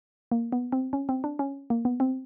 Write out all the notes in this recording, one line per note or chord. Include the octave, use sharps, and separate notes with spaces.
A#3
B3
C4
C#4
C4
D4
C#4
A#3
B3
C4